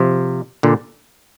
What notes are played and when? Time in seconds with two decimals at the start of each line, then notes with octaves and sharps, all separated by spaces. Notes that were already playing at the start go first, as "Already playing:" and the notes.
Already playing: C3 F3
0.63 A#2 D3